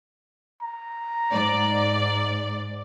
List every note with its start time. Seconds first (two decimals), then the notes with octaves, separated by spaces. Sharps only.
0.62 A#5
1.32 G#2 D5